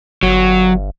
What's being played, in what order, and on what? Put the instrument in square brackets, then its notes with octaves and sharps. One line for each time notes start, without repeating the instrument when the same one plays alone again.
[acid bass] G1 [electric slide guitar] F#3